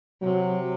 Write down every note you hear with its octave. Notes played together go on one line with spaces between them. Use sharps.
C3 F#3